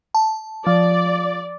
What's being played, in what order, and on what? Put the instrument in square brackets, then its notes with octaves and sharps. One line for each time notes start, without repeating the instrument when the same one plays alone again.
[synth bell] A5
[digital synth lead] F3 [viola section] D5